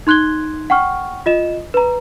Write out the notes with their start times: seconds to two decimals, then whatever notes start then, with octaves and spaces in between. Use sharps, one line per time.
0.07 D#4 C6 F#6 G#6 G7
0.70 F#5 G5 C#6 F6
1.26 F4 D#5 E7
1.74 B4 A#5